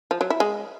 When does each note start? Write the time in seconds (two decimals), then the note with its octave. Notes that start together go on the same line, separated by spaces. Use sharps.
0.11 F3
0.21 F#3
0.30 E4
0.40 G#3